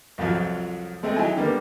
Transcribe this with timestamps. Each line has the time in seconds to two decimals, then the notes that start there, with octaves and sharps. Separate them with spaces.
0.18 C2 F2 F3 F#3
1.03 G#3 A3 C4
1.16 F#3 D#4 E4 G5 G#5
1.37 D3 G3 A#3 B3